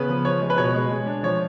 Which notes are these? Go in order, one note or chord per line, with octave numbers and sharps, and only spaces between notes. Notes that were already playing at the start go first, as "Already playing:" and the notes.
Already playing: C#3 B3 B4
F3
F3 C#5
G#3
B4
B2 C#5
G#3
G#3
D4
F3 C#5